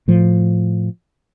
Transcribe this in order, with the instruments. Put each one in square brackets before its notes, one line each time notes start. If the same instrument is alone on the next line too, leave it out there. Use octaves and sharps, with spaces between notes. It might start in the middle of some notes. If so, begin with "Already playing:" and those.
[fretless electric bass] A2 F3